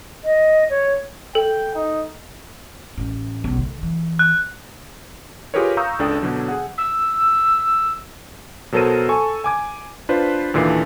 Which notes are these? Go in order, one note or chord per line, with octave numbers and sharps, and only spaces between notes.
D#5
C#5
A4 G5
D#4
A1
B1 C#3
D3
E3
F#6
F4 G4 G#4 A#4 B4 C#5
F5 A#5 C#6 D#6 E6 G6
C#2 D4 A4 G5 D#6 E6
B2 D3 F#3
G#4 F#5
E6
B2 F#3 A4 A#4 C5 D#7
A4 G#5 C#6
G#5 D6 G#6
D4 F4 B4 C5
D#2 A#2 D3 E3 C7